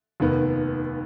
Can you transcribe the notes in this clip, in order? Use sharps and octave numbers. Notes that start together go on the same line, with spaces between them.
F1 D#2 D#3 B3